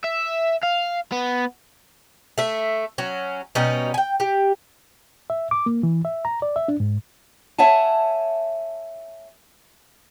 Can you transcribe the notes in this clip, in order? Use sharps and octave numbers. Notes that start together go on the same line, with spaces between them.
E5
F5
B3
A3 E5
F#3 C#4
B2 G3 C#4 D#4
G5 G#5
G4
E5
D6
A#3
E3
E5
A#5
D5
E5
D4
G#2
C#5 E5 F#5 G#5 A5